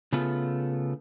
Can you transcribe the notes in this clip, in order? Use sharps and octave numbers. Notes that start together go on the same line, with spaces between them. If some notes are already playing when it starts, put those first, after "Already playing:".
C#3 A3 B3 F4